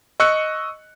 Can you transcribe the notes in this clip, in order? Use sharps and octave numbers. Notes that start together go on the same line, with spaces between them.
D#5 C#6 E6 F#6 C#7